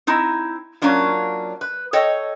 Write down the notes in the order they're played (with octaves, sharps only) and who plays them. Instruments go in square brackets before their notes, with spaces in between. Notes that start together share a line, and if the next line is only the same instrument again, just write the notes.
[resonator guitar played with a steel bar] C4 D#4 E4
F#3 A#3 C#4 D4 F4
B4
A4 C#5 D#5 G5